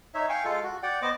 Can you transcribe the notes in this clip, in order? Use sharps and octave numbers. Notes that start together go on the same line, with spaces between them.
D#4 C#5 E5
F5 G5 G#5 C#6
G#3 F4 A4 F5
F#4
D5 F#5 G5
B3 C5 D#5 D6